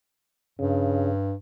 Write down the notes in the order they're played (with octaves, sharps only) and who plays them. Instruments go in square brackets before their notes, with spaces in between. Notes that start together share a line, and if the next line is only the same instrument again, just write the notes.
[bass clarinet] G2 [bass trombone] C#3